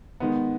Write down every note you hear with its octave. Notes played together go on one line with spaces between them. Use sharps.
D#3 G#3 B3